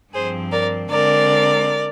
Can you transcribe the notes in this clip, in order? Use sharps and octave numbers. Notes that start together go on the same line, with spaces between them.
G2 F3 C4 G#4 C5
A#4 D5
D3 G#3 C4 A#4 D5